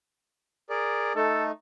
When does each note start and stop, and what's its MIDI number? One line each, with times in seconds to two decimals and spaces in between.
0.70 1.13 68
0.70 1.13 70
0.70 1.13 74
1.16 1.51 57
1.16 1.51 63
1.16 1.45 69